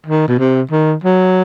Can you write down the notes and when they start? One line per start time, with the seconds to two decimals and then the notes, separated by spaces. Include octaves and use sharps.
0.06 D#3
0.28 B2
0.39 C3
0.71 D#3
1.04 F#3